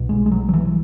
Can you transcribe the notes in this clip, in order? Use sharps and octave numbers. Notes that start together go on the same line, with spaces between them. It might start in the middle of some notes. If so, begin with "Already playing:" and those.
Already playing: B1 B2
G#3
G#3
F#3
F#3
E3